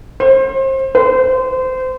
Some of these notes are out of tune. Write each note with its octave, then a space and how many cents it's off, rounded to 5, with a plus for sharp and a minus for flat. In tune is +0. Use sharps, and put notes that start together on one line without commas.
C5 +30
C5 -25